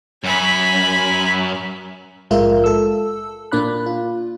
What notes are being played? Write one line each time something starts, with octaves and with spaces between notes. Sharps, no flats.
F#2 G#5 B5
A#1 G#2 G#3 F4 A#4 E5
A4 E6
A#2 A#3 D4 D5 B5 F#6
F4